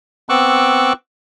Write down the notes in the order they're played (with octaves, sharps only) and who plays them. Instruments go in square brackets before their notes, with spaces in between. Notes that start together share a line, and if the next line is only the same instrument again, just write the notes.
[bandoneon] B3 C4 C#6 D6 E6 F#6